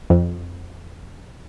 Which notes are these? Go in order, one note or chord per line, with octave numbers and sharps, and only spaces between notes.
F2